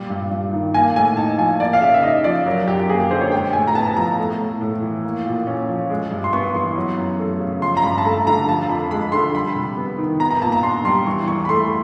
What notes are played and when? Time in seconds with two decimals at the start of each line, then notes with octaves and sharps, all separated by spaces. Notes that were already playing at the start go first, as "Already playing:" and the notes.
Already playing: A#2 G3
0.10 G2
0.31 G2
0.53 D#3
0.74 A#3 G#5
0.96 A2 G#5
1.17 D#4 A5
1.38 F3 G#5
1.60 A#3 D5
1.73 F5
1.81 C#3 E5
1.94 E5
2.03 D#4 D#5
2.24 F3 D5
2.46 F#3 A#4
2.67 F#2 G4
2.80 G4
2.89 A#3 G#4
3.00 G4
3.11 D3 C5
3.21 C#5
3.32 G#3 G5
3.53 A2 G#5
3.67 A#5
3.75 B3 A5
3.86 A5
3.97 F3 A#5
4.18 A3
4.39 A2
4.61 A2
4.82 E3
5.04 A#3
5.26 A#2
5.47 C#4
5.69 F3
5.90 G#3
6.11 G2
6.24 C6
6.33 B3 C#6
6.55 E3 C6
6.76 F#3
6.97 F#2
7.19 A3
7.40 C#3
7.62 F3 C6
7.77 A#5
7.84 G2 B5
7.98 A5
8.05 A3 A#5
8.27 D3 A#5
8.48 F3 A5
8.69 F2 B5
8.91 G#3 B5
9.12 D3 C6
9.34 G3 B5
9.55 C3
9.77 B3
9.98 D#3
10.20 B3 A#5
10.30 A#5
10.42 A#2 A5
10.52 A#5
10.63 D4 C6
10.85 G3 C6
11.05 E3 C#6
11.27 E2 C#6
11.45 B5
11.49 A3 C6